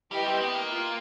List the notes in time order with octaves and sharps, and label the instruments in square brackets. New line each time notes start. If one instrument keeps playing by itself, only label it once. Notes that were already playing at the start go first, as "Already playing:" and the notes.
[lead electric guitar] G3 [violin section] E4 G4 B4 D#5 G5
[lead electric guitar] C4
B3
A#3
[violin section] F4